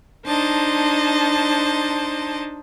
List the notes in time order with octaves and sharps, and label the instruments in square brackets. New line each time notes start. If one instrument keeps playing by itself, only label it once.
[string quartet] D4 D#4 C5 D#5 A5